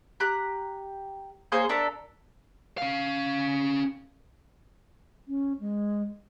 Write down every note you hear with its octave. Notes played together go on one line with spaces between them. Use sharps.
G4 A#5 F#6
A#3 G#4 C5 C#5
D4 A4 A#4 E5
C#4 F5
C#4
G#3